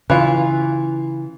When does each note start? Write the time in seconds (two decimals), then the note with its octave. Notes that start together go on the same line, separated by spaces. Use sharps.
0.10 C#3 E3 F4